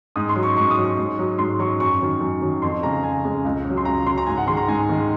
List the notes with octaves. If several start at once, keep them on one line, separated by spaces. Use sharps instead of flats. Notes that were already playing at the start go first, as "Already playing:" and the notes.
G#2 D#6
C6
F#3
C#6
G#2 C#6
D#6
F#3
C#6
G#2
F#3
G#2 C6
F#3 C#6
F#2 C#6
D#3 F#3
F#2
D#3 F#3
F2 C6
C#3 G#3 A#5
F2 G#5
C#3 G#3
C#2
C#3
F#3
C6
C#2 A#5
C#3 F#3 C6
A#5
G#2 G#5
F#5
D#3 G#3 C6
A#5
G#2 G#5
D#3 G#3